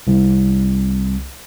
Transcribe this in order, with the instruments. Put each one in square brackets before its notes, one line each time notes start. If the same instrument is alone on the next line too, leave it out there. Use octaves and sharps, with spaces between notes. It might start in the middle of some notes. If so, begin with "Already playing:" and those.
[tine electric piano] C2